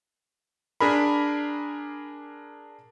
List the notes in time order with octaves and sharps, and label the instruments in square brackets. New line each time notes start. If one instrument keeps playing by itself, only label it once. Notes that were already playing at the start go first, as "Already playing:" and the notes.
[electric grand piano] D4 G#4 A#4 B5